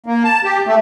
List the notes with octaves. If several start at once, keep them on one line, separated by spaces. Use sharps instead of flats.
A#3
A5
G4
A3